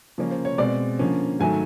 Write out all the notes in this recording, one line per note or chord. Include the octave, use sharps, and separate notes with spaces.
C#3 F3 A#3 C#4
C5
C#5
B2 G#3 C4 D5
D3 F3 A#3 C#4
G#2 D#3 F#3 A3 G#5